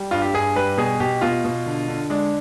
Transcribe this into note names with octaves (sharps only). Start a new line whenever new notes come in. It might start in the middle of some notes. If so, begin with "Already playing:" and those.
Already playing: G3
G2 F4
G4
G2 G#4
G3 B4
B2 G#4
B2 G4
B2 F4
B2
D3
D3
G#3 D4